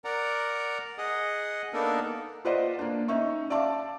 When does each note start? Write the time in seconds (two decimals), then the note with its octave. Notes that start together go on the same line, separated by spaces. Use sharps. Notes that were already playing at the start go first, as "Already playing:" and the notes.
0.05 A#4 D5 F#5 A#5
0.98 G#4 D#5 F#5
1.73 A#3 B3 D4 D#4 A4 A#4
2.45 F4 B4 C5 D5 D#5 F#5
2.79 A#3 D4
3.08 C#4 D#4 E5 C#6
3.50 D5 E5 F5 A5 D6